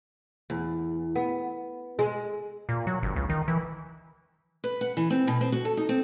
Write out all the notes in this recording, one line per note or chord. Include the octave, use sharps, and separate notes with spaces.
E2
B3
G#3
A#2
F#3
G1
C#2
D#3
E3
B4
F#5
E3
C4
B2
C4
F#4
A4
D#4
C4